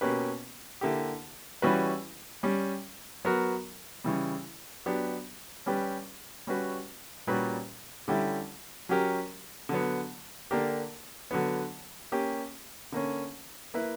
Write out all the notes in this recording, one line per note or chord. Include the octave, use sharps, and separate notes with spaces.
B2 A#3 C#4 G4 B4
D3 A#3 E4 G4
E3 G3 C#4 F#4 B4
G3 C#4 G4
F#3 B3 F#4 A#4
C#3 E3 G3
F#3 B3 D4 G4
G3 C#4 G4 B4
G3 C#4 F#4 B4
A#2 G3 C#4 F#4 B4
D3 G3 C#4 E4 G4
F#3 C#4 G4 A#4
D3 F#3 B3
D3 A#3 D4 G4 A#4
D3 F#3 B3
A#3 C#4 G4
D3 A#3 C#4
A#3 E4 B4